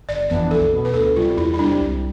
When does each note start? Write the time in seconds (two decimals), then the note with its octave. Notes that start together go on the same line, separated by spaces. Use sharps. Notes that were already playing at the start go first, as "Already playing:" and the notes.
0.08 G1 D5
0.30 F2 E3 B3 D4 D5
0.51 B1 A4
0.72 B2 B3
0.85 B4
0.94 D2 A4
1.16 C3 G3 F4
1.37 E2 E4
1.54 E4
1.59 C3 G3 D4
1.80 C2